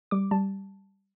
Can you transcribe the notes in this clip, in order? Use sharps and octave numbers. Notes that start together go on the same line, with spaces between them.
G3 D6
G3 A5